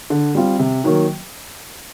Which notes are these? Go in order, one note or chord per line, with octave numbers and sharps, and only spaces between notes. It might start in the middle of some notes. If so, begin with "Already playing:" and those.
D3
G3 C4 F4
C3
D#3 F#3 A#3